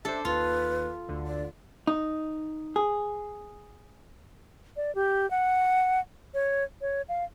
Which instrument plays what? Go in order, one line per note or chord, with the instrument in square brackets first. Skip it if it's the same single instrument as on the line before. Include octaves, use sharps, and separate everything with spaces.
[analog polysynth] D4 C5 [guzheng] A4 [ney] E5
[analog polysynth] D#2 [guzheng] F4 [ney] B4
[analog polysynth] D2 D3
[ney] D5
[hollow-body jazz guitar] D#4
G#4
[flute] D5
G4
F#5
C#5
C#5
F5